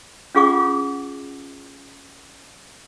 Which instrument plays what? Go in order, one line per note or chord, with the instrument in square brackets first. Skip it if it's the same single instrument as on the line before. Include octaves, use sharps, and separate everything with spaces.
[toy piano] C#4 F4 G#4 F#5 C#6 D6